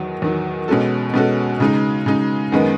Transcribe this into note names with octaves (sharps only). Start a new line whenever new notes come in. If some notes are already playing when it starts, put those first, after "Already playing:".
Already playing: E2 D#3 F#3
E2 D#3 F#3
B2 G#3 C#4 F#4 A4
B2 G#3 C#4 F#4 A4
C#3 G#3 D#4
C#3 G#3 D#4
F#2 D#3 G#3 B3